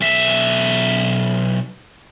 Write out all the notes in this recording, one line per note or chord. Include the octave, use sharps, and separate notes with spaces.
B1 E5